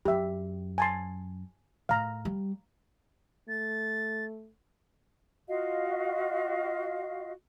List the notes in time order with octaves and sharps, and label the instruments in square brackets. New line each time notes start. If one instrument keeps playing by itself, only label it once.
[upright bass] F#2 [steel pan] G4 E5
[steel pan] G#5 A5 C6
[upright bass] A2 [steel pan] F5 A#5
[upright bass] G3
[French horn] A3 [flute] A6
[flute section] F4 F#4 D#5 F5